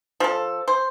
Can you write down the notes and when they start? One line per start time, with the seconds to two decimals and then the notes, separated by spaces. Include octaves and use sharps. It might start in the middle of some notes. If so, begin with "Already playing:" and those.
0.20 F3 A4
0.68 C5